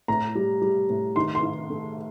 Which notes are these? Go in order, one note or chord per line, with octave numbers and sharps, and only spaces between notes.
A2 A#5
G3
G3
A2
D#3 C6
C6
D#3
A3